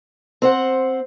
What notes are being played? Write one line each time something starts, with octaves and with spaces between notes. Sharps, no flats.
C4 C5 F#5